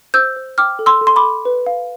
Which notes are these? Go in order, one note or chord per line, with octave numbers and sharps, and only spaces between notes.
C5 E6 G6
C5
G5 D6 F6
A4
C6 E6
A4
C6
B5 D6
A4
B4
F5